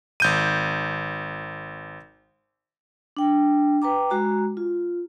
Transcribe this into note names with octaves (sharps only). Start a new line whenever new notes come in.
G#1 G6 D#7
D4 G5
B4 G5 A#5 D6
G#3 F#4 A#5
F4